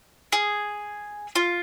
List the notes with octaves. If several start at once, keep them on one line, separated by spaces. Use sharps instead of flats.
G#4
F4